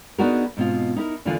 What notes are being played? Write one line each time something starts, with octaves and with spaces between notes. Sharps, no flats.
B3 D4 D#4 F#4 G#4 A#4
G#2 B2 C4 F4
D#4 E4 A#4
E2 D3 E3 A#3 F4 G#5